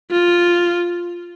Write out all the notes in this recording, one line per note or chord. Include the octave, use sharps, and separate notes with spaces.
F4